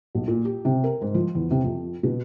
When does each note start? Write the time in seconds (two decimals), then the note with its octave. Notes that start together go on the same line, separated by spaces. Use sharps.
0.15 B1
0.27 A#2
0.45 G4
0.65 C3
0.84 A#4
1.02 G#2
1.14 F3
1.35 E2
1.51 C3
1.64 F2
2.03 B2